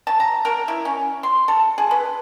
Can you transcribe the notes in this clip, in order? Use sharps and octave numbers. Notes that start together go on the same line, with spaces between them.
A5
A#5
A#4
E4
C#4
C6
A4
G#4
B4